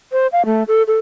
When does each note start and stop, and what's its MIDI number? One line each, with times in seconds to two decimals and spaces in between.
0.12 0.27 72
0.32 0.45 77
0.46 0.63 57
0.68 0.83 69
0.88 0.98 69